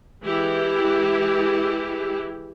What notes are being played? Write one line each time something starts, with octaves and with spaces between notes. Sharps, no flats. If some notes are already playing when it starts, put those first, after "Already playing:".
E3 G#3 E4 G4